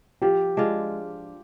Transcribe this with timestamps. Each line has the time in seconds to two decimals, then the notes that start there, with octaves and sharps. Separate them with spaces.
0.22 F3 G4
0.57 G#3 D4 F4